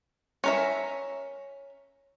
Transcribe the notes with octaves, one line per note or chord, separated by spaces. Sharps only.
C#4 A#4 E5